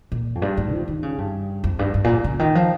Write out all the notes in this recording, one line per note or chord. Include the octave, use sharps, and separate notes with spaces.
A#2
F2
G2
G#2
F3
D#3
C#3
G2
F2
G2
G2
A#2
C#3
D#3
F3